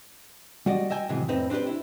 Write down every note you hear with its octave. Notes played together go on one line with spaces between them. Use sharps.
G3 F#4 D5 D#5
D#5 E5 G5 G#5
A2 C3 D#3 E3 F#3 G#3
F2 A2 C4 D#4 B4
C4 D4 D#4 G4 B4
E4